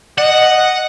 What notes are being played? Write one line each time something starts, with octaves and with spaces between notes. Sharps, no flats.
D#5 F#5